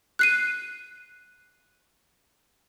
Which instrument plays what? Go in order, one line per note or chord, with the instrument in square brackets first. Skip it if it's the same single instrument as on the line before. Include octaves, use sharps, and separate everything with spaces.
[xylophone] F#6 C7 D#7